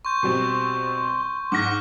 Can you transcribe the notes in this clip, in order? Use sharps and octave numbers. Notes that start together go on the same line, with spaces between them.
C6 C#6 G6
B2 G3 C4
G#2 F#5 D6 F6 F#6 A#6